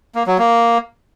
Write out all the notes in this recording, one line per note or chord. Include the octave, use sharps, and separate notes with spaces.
A#3
F#3
A#3